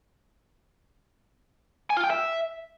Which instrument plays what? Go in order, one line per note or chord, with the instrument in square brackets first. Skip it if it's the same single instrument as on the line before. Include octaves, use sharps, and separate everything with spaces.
[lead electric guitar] G#5
F4
G5
E5